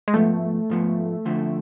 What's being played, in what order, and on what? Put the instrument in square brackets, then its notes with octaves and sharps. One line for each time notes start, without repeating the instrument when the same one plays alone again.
[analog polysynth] G#3
[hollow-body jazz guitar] G#2 F3 B3 [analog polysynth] A3
[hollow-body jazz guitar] G#2 F3 B3
D3 F3 A3 C4